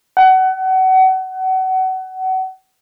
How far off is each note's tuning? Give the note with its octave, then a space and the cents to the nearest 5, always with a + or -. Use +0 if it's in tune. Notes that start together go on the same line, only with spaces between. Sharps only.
F#5 +30